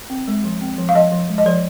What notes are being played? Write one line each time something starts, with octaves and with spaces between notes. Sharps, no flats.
C4
G#3
F3
C4
F3
F5
F3 D#5
F3
G#3
D#5
F3 D5